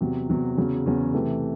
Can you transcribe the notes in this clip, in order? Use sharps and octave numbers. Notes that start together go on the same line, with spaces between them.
E2 C3 F#3
E2 C3 F#3
E2 C#3 F#3 C#4
E2 C#3 F#3 C#4
C3 E3 A3